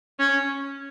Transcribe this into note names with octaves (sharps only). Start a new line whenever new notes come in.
C#4